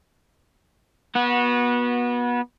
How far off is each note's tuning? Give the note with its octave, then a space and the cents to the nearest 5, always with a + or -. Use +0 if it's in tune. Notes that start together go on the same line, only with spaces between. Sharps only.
B3 -25 F#4 -15